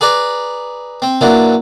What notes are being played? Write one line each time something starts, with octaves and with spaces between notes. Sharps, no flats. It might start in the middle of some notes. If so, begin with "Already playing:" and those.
G#4 B4 D5 A#5
C4
A#2 E3 F#3 D4